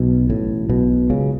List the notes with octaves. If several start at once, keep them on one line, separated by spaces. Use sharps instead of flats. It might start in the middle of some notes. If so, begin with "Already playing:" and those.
Already playing: B1 B2
A1 A2
B1 B2
C#2 C#3